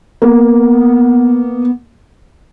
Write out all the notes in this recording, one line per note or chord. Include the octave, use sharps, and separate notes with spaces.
A#3 B3